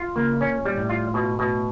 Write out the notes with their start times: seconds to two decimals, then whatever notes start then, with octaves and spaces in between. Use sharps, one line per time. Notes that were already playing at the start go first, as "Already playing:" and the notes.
Already playing: F4
0.16 C#3 A#3
0.41 A#2 C#4
0.65 G3
0.77 A2
0.89 F4
1.14 B2
1.39 B2